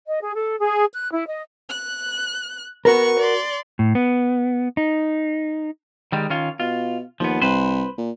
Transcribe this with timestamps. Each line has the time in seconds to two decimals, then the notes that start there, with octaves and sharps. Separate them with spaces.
0.06 D#5
0.22 G#4
0.35 A4
0.59 G#4
0.94 F#6
1.12 E4
1.28 D#5
1.69 F#6
2.85 B3 F#4 A#4 C#6
3.19 D5 C6
3.79 A2
3.95 B3
4.77 D#4
6.12 D#3 G3 G#3
6.30 D#3 C#4 F4
6.60 B2 F4
7.20 D#2 F3 B3
7.42 C2 B4 C5
7.98 A#2